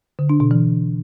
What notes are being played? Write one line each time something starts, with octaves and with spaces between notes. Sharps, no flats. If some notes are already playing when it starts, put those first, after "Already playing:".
D3
D4
B2
E3